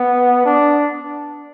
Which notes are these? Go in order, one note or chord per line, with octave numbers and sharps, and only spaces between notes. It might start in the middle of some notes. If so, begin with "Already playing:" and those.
Already playing: B3
D4